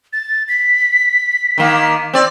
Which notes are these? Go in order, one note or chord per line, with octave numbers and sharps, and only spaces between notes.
A6
B6
D#3 A#3
C4 D5